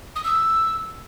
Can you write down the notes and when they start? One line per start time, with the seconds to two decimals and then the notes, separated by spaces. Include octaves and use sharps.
0.16 D#6
0.24 E6